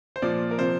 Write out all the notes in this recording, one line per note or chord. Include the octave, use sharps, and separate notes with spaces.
C5
A#2 F3 D5
A#4
C3 F3 C5